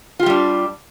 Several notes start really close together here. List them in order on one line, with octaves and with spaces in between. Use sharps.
F4 G4 G3 D4